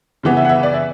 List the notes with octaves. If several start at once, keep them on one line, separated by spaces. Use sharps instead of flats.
C#3 E3 B3
E5
F#5
E5
D5
E5